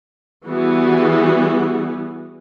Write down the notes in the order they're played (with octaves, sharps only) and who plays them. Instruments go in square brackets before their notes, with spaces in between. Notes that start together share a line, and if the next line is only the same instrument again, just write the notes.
[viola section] E3 G3 B3 F#4 G#4